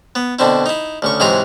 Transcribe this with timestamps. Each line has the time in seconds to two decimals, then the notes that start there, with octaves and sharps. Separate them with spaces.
0.15 B3
0.39 B2 D3 C4 E4
0.66 D#4 E4
1.02 D2 C#3 C#6
1.20 G#2 C3 E3 F#3 G#4 A#5